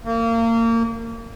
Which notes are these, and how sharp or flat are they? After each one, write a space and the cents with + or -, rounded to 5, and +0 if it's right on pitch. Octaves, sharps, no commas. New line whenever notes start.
A#3 -30